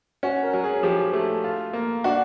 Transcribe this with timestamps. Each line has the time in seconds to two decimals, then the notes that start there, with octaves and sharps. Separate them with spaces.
0.23 C#4 F#4
0.43 A#4
0.53 F#3
0.64 G#4
0.83 F3 G4
1.13 A3
1.44 F4
1.73 A#3
2.04 D4 F#4